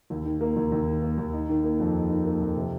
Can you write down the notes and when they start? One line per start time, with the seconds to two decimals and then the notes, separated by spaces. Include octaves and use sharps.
0.10 D#2
0.25 D#3
0.41 A#3
0.56 D#2
0.72 D#2
0.87 D#3
1.02 A#3
1.18 D#2
1.33 D#4
1.49 D#3
1.64 A#3
1.79 F2
1.95 D#4
2.09 D#3
2.26 A#3
2.41 F2
2.56 C3